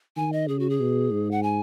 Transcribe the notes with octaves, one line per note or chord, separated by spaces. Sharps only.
D#3 G#5
D#5
C#3 G#4
F#4
G#4
B2
G#2
F#5
G#5